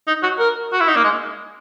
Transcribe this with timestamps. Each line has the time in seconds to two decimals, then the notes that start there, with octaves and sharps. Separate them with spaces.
0.07 D#4
0.23 F#4
0.39 A#4
0.72 F#4
0.80 E4
0.88 D#4
0.96 A#3
1.04 G#3